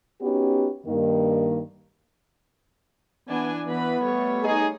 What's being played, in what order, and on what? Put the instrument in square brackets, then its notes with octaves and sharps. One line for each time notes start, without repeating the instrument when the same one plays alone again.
[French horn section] B3 C#4 D#4 F#4 G4
G2 D#3 A#3
[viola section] E3 D4 G#5 [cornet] B3
[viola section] E3 B4 B5 [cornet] B3
[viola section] G3 A3 C#5
[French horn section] D#4 G#4